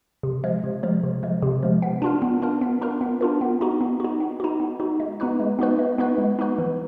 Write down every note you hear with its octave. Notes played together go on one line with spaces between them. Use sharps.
C3
F3 G#3
C3
F3 G#3
C3
F3 G#3
C3
F3 G#3
B3
D4 F4 A#4
B3
D4 F4 A#4
B3
D4 F4 A#4
B3
D4 F4 A#4
B3
D#4 F#4
B3
D#4 F#4
B3
D#4 F#4
B3
D#4 F#4
G#3
B3 D#4 F#4 B4
G#3
B3 D#4 F#4 B4
G#3
B3 D#4 F#4 B4
G#3
B3 D#4 F#4 B4
E3